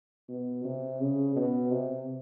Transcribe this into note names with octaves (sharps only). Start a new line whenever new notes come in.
B2
C3
C#3
B2
C3